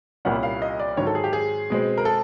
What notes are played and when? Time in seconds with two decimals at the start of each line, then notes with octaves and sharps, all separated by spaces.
0.25 C2 A#2 G3 A#3 C#4 F#5
0.43 F5
0.62 D#5
0.79 D5
0.97 G#2 D#3 F#3 C#5
1.07 A4
1.15 G#4
1.24 G4
1.33 G#4
1.70 B2 G#3 C4
1.98 A#4
2.05 A4